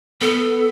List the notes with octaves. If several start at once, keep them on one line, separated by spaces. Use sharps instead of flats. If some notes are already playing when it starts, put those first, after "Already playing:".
B3 A4